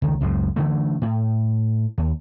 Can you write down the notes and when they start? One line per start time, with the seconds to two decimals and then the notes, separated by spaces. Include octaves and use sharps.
0.02 C#2 D#3
0.21 C#2 F#2 A2 G#3
0.56 D3 E3 A3
1.02 A2
1.98 D#2